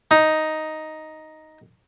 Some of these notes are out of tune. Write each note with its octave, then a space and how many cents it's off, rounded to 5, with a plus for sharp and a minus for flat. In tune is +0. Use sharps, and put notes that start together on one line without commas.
D#4 +5